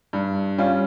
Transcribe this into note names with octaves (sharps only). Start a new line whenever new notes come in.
G2
G3 C#4 F4